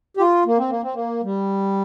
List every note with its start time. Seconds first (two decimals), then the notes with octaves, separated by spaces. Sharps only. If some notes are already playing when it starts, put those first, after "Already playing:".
0.17 G4
0.20 F4
0.46 A#3
0.58 C4
0.70 A#3
0.83 C4
0.94 A#3
1.24 G3